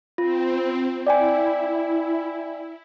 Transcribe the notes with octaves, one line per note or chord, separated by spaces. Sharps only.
C4 F4
E4 D5 G5 G#5